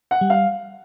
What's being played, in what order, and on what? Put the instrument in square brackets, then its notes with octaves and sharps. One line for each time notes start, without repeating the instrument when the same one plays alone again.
[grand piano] F#5
[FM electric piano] G3
[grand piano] F5